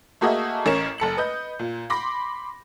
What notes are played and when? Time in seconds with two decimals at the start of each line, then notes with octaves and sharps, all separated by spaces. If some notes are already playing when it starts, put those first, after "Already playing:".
0.21 A3 A#3 F#4 G#4 D#5 E5
0.66 A1 C#4 A#4 C#6 E7
0.98 F#1 A4 C#7 F#7
1.17 B4 D#5 G6
1.59 A#2
1.90 B5 C6 D6 A#6